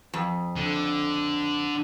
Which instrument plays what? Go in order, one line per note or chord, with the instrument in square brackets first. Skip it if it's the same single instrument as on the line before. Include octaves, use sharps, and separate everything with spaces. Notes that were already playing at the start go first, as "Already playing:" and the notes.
[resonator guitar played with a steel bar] F2
[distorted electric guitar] D3